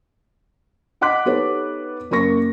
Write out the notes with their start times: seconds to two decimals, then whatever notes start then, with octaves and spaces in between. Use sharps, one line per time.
1.01 D#5 F#5 C6 D6 F#6 B6
1.25 B3 D#4 G4 A4 B4 C#5
2.11 F#1 A#3 A#4 C#6 A#6